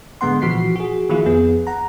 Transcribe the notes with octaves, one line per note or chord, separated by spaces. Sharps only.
A2 D3 G#3 B3 F#5 C6
A#2 E3 F3 F#4 B6 C7
F#4 G#4
D#3 F3 A#3 E4 F4 G#4
F2 B3 G#4
F#5 A#5